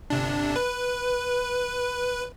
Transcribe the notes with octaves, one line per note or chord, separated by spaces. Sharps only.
G1 C3 D4
B4